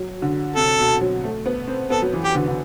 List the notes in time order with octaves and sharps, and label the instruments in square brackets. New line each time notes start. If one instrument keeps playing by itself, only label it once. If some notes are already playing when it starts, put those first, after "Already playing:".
Already playing: [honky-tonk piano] F#3
D3
[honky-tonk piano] C3 [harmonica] A4
[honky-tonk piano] B2
F#3
A3
B3
C4
[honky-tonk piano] B3 [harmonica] A4
[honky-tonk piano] F#3
E3
[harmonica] G4
[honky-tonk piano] D3
D3